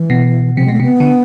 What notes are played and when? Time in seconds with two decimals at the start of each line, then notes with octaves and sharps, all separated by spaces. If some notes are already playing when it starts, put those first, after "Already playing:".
Already playing: E3
0.10 B2
0.57 C3 F3
0.65 G#3
0.68 B2 A3
0.80 C3 B3
1.00 D3